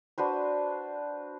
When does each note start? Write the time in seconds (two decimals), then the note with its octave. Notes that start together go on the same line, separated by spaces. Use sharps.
0.18 D4 F#4 B4 C5